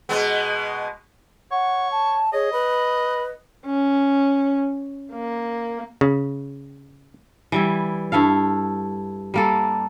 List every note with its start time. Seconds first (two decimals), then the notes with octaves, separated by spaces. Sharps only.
0.09 B2 G#3 B3
1.51 C#5 F#5
1.92 A5
2.33 G#4 C#5 D#5
2.53 B4 B5
3.66 C#4
5.13 A#3
6.01 C#3
7.52 E3 G3 E4
8.12 G2 E4 A4 F5
9.34 G3 A#3 A4